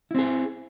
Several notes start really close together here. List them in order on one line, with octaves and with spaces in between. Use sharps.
E4 C4 G#4